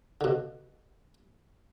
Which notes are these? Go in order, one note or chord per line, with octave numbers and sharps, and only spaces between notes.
B2 D3